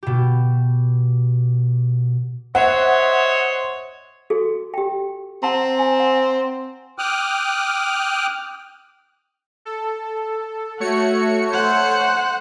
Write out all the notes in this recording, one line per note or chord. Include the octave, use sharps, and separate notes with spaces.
B2 G4
C5 C#5 D#5 E5 F#5 C6
F#4 G#4 A4
G4 G5
C4 F#5 A5 A#5
G#5 A#5
F#5
G5 D6 D#6 F6 F#6
A4
A3 F#4 C#5 C#7
C5 F#5